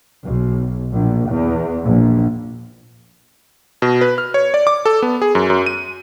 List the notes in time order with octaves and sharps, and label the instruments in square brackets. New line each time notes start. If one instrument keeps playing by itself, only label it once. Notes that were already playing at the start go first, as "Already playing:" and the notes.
[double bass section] B1
A#1
E2
A#1
[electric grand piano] B2
B4
F6
C#5
D5
D6
A4
B3
G#4
F#2
F#2
D#7